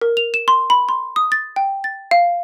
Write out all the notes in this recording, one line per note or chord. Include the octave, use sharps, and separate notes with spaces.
A#4
F7
E7
C6
B5
C6
D#6
A6
G5
A6
F5